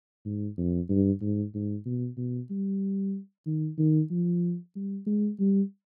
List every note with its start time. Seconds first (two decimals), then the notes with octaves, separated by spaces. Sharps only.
0.25 G#2
0.58 F2
0.89 G2
1.21 G#2
1.54 G#2
1.85 B2
2.17 B2
2.50 G3
3.46 D#3
3.78 D#3
4.11 F3
4.76 G3
5.07 G#3
5.39 G3